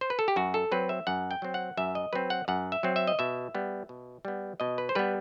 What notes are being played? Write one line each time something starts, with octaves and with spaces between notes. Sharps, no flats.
C5
B4
A4
G4
F#2 F#4
A4
F#3 C4 B4
E5
F#2 F#5
G5
F#3 C4
F#5
F#2 E5
D#5
F#3 C4 B4
F#5
F#2 F#5
E5
F#3 C4
E5
D#5
B2 E5
G3 B3
B2
G3 B3
B2 D#5
B4
C5
G3 B3 B4